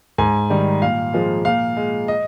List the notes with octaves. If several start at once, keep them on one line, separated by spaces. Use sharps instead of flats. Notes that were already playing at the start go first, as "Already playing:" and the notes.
G#2 G#5
D#3 G3
A#2 F5
F3 G#3
A#2 F5
G#3
D#5